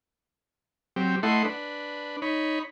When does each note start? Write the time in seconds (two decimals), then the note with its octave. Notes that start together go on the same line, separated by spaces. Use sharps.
0.96 F#3 C4 G4
1.23 A3 E4 A4 D#5 F#5 C6
1.45 D4 B4
2.22 D#4 C#5 B5